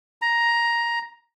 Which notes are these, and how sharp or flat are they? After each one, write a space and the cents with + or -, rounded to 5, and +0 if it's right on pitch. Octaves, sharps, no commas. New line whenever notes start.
A#5 +10